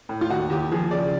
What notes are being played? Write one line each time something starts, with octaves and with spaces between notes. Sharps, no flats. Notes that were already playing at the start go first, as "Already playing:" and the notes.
A2
F4
D#2 F#4
D#2 G4
F3 G#4
C#3 D5